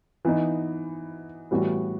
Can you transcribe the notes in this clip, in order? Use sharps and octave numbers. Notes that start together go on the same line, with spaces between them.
E3 B3 D#4
A2 E3 G3 B3 F#4